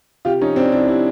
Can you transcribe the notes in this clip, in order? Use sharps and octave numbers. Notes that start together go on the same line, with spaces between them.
C3 F4 G4
F3 C#4 D#4
F3 C4 D4
C3 D4 E4
C3 D4 E4